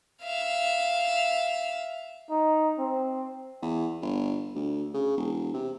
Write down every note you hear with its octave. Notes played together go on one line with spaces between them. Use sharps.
E5 F5
D#4
C4
E2
G1
D2
C#3
E1
C3